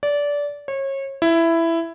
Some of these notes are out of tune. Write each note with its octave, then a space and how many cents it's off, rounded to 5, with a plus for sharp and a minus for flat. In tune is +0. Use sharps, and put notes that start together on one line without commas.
D5 -20
C#5 -30
E4 +10